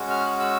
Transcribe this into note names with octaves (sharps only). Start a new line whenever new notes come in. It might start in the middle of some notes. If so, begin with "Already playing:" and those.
Already playing: G#3 C#4 F#4
F6
F#6
E6